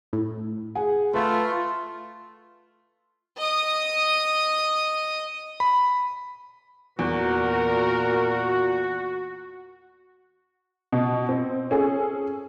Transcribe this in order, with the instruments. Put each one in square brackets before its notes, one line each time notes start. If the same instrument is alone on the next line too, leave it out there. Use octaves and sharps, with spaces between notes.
[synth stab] A2
[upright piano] G#4 F#5 G#5
[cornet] A3 [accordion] F4 [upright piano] B4
[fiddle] D#5 D#6
[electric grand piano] B5
[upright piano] E2 [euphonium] A#2 [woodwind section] F#4 [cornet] A#4
[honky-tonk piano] B2
C4
C#4 G#4 A4